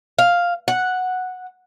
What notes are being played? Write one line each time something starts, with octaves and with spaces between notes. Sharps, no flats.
F5
F#5